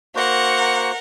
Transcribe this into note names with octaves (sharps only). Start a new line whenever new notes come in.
A#3 F#4 A#4 C5 F#5